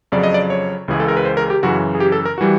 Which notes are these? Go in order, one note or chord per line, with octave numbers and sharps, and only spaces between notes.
F2 C#3 F#3 D5
D#5
D5
C#5
C#2 C#3 E3 G#3 G#4
A4
A#4
B4
C5
A#4
G4
F#2 C#3 E3 F#4
G#4
G4
A4
A#4
E3 G3 F#4